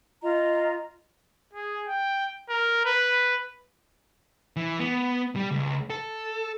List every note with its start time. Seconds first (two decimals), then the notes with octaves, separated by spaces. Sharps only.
0.22 F4 D#5 A#5
1.54 G#4
1.88 G5
2.50 A#4
2.85 B4
4.57 E3
4.79 B3
5.36 G3
5.51 C#2
5.90 A4